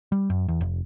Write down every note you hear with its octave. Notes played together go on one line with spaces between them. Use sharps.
G3
F#2
E2
F1